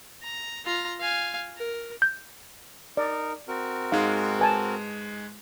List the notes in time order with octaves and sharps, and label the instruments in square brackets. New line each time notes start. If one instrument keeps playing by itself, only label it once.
[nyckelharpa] A#5
F4 A#5
F5 G#5
A#4
[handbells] G6
[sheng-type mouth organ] D#4 A#4 [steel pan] D5
[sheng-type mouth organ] C4 F#4 A#4
[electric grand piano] G#2 G#3 [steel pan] D#4 F5
[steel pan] B4 G#5 A5